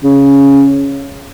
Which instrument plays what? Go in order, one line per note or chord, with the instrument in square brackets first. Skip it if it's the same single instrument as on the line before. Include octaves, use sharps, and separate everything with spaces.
[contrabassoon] C#3